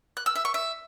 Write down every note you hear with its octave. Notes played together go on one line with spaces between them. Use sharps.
F#6
E6
E5
C#6
E5